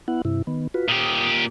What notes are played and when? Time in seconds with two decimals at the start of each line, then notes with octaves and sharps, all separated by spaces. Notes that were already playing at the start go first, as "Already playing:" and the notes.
0.08 B3 E4 F#5
0.25 G2 C3 E4
0.47 D#3 B3
0.74 F4 F#4 B4
0.88 A#2 G4 D#6